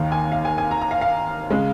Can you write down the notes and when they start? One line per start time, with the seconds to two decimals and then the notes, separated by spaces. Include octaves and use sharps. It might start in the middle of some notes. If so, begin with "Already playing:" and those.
Already playing: D#2 D#3 A#3 F5
0.12 G#5
0.32 F5
0.45 G#5
0.58 G#5
0.71 A#5
0.82 A#5
0.91 F5
1.01 F5
1.50 C#3 G#3